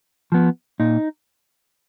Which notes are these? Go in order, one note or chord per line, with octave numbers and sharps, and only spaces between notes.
F3 B3
A#2 D#4